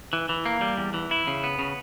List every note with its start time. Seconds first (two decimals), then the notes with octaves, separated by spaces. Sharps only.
0.13 E3
0.29 E3
0.46 A#3
0.61 G3
0.77 E2
0.94 E3
1.11 E4
1.27 C#3
1.44 B3
1.59 C#3